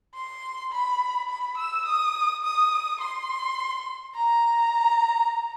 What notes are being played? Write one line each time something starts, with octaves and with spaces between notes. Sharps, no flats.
C6
B5
B5
E6
D#6
D#6
C6
A#5